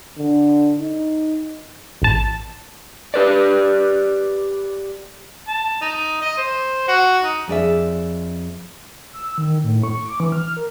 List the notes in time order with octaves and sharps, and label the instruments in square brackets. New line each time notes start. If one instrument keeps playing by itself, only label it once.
[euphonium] D3
D#4
[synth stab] A1 A5
[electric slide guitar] G4 B4 D5
[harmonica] A5
D#4
D#5
C5
F#4
D#4
[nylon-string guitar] F2 G#4 D5 E5
[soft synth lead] E6
D#3
A2
C#6
D6
E3
F6
A#4